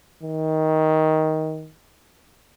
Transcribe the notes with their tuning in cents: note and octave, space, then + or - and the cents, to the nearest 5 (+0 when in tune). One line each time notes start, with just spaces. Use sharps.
D#3 +15